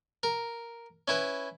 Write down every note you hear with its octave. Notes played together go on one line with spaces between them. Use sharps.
A#4
C#4 E4 B4